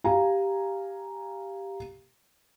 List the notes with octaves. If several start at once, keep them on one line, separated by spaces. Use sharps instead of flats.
G4 F5 G#5 A#5